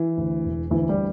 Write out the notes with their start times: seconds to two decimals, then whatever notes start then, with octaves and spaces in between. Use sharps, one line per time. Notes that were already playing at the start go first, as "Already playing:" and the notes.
Already playing: E3
0.17 D2
0.44 E1
0.70 D2 E3
0.89 G3